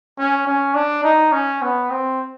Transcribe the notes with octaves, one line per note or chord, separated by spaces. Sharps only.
C#4
C#4
D4
D#4
C#4
B3
C4